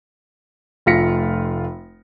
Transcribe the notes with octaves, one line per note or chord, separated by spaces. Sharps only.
F1 A3 F4 A#6 B6 C#7